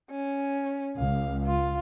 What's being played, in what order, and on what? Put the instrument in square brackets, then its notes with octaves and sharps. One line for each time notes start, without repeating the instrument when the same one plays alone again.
[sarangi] C#4
[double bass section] C#2 [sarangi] F5
[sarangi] F4